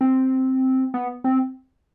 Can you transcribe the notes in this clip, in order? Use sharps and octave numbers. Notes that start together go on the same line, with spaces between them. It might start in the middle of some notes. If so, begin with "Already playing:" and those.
C4
B3
C4